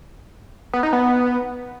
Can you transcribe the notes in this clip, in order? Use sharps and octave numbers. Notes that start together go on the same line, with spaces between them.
B3
D#4
B3